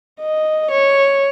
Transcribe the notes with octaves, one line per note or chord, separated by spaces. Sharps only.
D#5
C#5